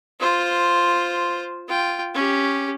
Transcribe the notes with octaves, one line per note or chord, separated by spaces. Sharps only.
F4 C5
F4 G5
C#4 G4